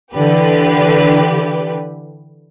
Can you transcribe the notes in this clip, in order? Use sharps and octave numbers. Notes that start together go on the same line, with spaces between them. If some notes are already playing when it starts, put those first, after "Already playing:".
D3 E3 G4 B4